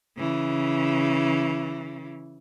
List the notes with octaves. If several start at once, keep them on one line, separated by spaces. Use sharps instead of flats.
C#3 E3